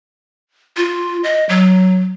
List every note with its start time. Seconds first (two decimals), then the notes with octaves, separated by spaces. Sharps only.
0.77 F4
1.24 D#5
1.49 F#3